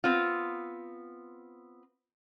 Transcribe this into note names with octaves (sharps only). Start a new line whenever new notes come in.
B3 C4 F4